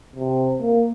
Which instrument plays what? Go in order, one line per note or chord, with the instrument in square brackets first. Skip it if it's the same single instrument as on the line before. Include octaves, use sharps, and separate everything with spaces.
[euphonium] C3
A#3